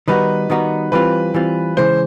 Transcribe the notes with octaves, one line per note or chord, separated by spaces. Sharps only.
D#3 G3 B3 D#4 F#4 B4
D#3 G3 B3 D#4 F#4
E3 G3 C4 F4 B4
E3 G3 C4 F4
C#3 E3 G#3 C5